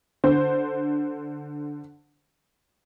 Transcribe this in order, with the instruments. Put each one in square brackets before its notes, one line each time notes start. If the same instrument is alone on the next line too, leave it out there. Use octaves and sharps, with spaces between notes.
[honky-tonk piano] D3 C5